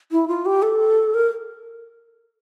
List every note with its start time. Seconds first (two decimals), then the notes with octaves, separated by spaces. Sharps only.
0.12 E4
0.28 F4
0.46 G4
0.62 A4
1.14 A#4